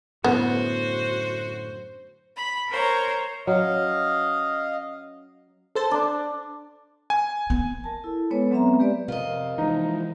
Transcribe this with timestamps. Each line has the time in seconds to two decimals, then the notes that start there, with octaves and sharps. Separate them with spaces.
0.24 F#2 A2 D3 B3 F#4 C5
2.36 B5
2.69 A#4 C5 C#5 A#5
3.47 F#3 C#4 D#5 F5
5.75 A4 C5 A5
5.91 D4
7.10 G#5
7.50 B3
7.84 A#4 A5
8.04 E4 A4
8.31 G#3 B3 A4 B4 C#5
8.51 F#3 B3 C4 E5 A#5
8.79 G#3 G4 B4 D5
9.08 F2 C3 F4 A#4 D#5
9.58 E3 F3 G#3 A#3 D#4 E4